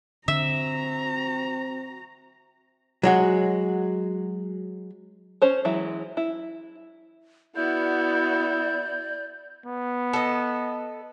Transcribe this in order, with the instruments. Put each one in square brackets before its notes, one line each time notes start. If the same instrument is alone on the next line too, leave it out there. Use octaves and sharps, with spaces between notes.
[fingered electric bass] D3 [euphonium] C4 [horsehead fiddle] F#4 A#5 [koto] E5
[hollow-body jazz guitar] F#3 G#3 F#4
[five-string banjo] C#4 C5 C#5
E3 F#3 G#3 E4
E4
[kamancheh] B3 F#4 [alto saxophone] E4 [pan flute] D5 [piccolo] G6
[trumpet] B3
[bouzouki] A4 D#5